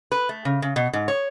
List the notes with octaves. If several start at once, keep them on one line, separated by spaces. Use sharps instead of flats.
B4
A3
C#3
C#3
B2
G#2
C#5